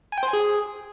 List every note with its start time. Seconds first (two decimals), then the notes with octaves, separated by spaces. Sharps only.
0.12 G#5
0.18 G5
0.23 C5
0.28 G#5
0.33 G#4